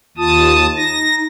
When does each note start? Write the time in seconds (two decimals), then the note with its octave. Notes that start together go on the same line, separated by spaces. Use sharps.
0.17 D#2 F4 A5 D#6
0.76 D#4 A#6